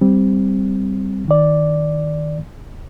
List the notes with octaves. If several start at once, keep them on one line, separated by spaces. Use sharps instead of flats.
G3 C4
D#3 D5